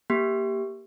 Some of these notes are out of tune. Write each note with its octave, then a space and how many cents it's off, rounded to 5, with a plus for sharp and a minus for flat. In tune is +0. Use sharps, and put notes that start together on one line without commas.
A#3 +0 G4 +0